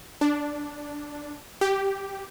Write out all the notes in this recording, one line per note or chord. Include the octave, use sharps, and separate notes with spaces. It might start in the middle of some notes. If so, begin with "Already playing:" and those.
D4
G4